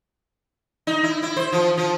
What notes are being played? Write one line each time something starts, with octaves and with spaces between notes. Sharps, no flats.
D#4
E4
E4
C5
F3
F3